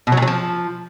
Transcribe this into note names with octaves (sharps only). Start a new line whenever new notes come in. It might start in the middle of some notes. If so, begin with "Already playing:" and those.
B2
F#3
A#2
F#3
F3